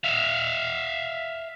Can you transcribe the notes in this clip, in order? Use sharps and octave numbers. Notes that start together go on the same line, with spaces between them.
E5 F5